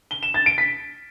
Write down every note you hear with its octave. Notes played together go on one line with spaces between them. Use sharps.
G7
E7
A6
D7
B6